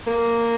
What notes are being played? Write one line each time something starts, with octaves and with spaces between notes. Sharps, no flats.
A#3